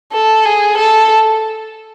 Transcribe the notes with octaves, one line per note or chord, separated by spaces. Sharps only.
A4
G#4
A4